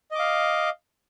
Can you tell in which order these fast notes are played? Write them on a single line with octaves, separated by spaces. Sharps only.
D#5 D6 F5